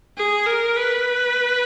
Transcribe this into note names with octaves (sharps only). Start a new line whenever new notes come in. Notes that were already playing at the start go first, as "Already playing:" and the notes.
G#4
A#4
B4